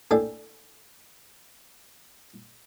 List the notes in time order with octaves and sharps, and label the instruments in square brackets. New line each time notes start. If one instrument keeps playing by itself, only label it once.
[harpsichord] A2 D4 A4 G5 G#5